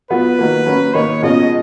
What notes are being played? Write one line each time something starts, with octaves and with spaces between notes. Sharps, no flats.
F#3 B3 F4 B4
D#3 F#3 A#3
F#3 A#3 C#4 F#4
D#3 A#3 D#4 C#5
B2 G#3 C#4 F4 D#5